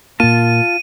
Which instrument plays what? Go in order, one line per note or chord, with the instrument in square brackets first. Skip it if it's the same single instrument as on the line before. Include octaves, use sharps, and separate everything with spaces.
[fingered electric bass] A#2 A#3 [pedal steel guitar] F4 A5 [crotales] D#7